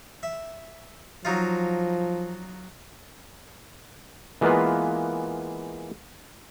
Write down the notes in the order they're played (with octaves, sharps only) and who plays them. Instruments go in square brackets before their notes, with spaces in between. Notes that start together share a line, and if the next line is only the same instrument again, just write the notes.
[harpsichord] E5
[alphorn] F3 [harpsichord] F#3 D#4 F4
[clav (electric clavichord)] E3 G#3 A#3 B3 F4 B4